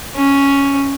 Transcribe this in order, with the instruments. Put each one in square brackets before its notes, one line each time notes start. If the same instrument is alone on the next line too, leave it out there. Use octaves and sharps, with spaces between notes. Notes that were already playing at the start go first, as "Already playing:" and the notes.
[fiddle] C#4